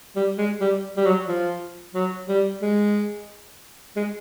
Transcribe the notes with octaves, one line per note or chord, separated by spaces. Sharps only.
G3
G#3
G3
G3
F#3
F3
F#3
G3
G#3
G#3